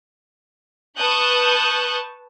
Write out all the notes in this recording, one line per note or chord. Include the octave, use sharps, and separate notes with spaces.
B4 A5 C#6 D#6 F#6 G6